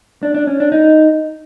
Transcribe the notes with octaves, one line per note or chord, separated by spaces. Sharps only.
D4
D4
C#4
D4
D#4